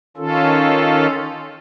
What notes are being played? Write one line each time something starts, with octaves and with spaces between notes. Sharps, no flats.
D#3 C#4 F4 A4